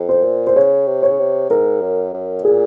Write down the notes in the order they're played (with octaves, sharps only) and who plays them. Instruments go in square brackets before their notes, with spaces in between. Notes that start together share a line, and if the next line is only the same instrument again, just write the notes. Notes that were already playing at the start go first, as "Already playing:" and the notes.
Already playing: [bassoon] F2
[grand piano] C5
[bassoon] A#2
[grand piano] C5
[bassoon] C#3 [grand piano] C#5
[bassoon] C3
[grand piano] C#5
[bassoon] C#3
C3
[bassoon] G#2 [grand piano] A#4
[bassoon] F#2
F#2
[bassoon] A#2 [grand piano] G#4